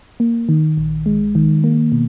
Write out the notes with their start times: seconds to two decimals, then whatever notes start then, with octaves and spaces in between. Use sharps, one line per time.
0.20 A#3
0.49 D#3
0.77 A#1
1.06 G#3
1.35 D#3
1.64 A#3
1.92 B2